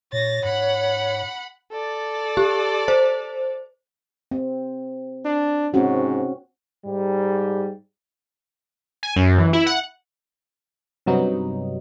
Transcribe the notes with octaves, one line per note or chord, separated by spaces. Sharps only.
A#2 C#5 A6 A#6
G#2 F#5 B5
A4 D5
G4
C5
C4
D4
G#2 C4 C#4 F#4
G#2 G3
G#5
F#2
E3
E4
F#5
G2 C3 F#3 B3 D#4